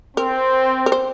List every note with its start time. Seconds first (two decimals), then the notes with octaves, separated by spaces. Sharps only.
0.17 C4 A#4
0.86 A#4
0.92 C5